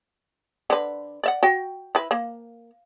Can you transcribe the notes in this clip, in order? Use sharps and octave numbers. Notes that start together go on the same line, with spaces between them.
D3 B4
D5 E5 F#5
F#4 G5
E4 B4
A#3